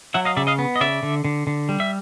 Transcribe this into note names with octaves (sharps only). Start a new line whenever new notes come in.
F#3 E5 F#5
D#5 F5
C#3 D5 E5
D#5 F5
B3
D#5
C#3 D5 E5
D3
D3
D3
G3
E5